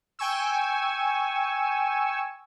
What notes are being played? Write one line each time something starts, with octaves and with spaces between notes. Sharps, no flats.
G5 G#5 C#6 E6